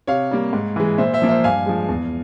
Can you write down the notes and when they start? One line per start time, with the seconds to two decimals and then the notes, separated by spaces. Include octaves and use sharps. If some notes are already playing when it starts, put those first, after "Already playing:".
0.07 C3 C#5 F5
0.31 G3 A#3
0.53 G#2
0.76 E3 G#3
0.98 A#2 C5 E5
1.14 C5 E5
1.22 F3 A#3
1.29 C5 E5
1.44 G2 F5 G#5
1.66 F3 G#3
1.89 E2